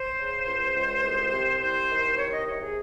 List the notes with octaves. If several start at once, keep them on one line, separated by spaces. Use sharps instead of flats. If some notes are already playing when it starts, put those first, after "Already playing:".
Already playing: C5
C#3
C#2
C#2
C2
C3
C2 C5
D#3
C2 C#5
D#5
C3 C#5
G#4